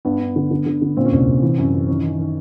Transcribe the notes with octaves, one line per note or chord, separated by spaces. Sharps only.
G2 B3
G2
D3
D3
D3
D3
A#2 C4
C#4
C2 C4
C2
E3
F#2
E3
D#3 C#4
D#3
D#3